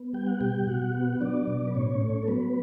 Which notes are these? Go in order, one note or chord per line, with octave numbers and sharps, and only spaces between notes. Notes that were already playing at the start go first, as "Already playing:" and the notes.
Already playing: B3
G3 G5
F#5
B2 G4 G5
B2 F#4 F#5
B3
F#3 D4 D5
B2
B4
A2 C#4 C#5
A3
A4
F#3 B3 B4